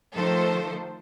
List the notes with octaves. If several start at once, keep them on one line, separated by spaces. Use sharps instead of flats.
D#3 F3 A3 A4 C5